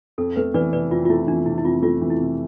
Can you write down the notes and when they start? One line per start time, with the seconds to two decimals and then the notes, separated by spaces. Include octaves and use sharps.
0.18 F2 A4
0.36 A3 B4
0.54 E3 B4 D5
0.73 C3 B4 D5
0.91 F2 F4
1.05 F4
1.09 A3 E4
1.27 E3 D4
1.46 C3 E4
1.58 E4
1.64 F2 F4
1.82 A3 F4
2.02 E3
2.10 E4
2.20 C3